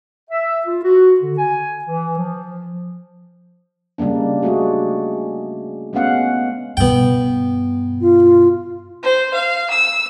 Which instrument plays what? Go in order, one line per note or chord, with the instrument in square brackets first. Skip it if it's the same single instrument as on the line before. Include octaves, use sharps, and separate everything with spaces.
[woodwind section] E5
F4
F#4
D3
G#5
E3
F3
[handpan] C#3 G3 G#3 A#3 D4
G#3 A3 D4 F#4 G#4
G#3 A3 B3 C#4 F5 F#5
[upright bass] G2 B2 [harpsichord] B3 G5
[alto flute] F4
[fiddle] C5
F5
E6